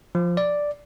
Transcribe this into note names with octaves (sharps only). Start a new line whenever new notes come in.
F3
D5